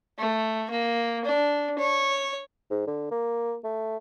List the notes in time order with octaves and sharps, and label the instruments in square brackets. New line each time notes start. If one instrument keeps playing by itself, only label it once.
[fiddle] A3
A#3
D4
C#5
[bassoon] G#2
D3
A#3
A3